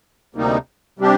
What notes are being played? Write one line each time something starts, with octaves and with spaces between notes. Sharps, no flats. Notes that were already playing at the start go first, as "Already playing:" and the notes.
D2 C3 G3 A#3 D#4
C3 G3 D4 G4